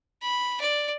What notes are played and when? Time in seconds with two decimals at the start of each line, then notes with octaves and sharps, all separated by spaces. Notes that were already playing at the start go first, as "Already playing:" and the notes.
0.22 B5
0.61 D5